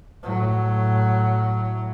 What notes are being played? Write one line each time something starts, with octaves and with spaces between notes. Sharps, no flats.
A2 F#3